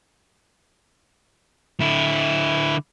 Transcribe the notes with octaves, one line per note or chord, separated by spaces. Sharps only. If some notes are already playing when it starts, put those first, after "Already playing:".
D3 E4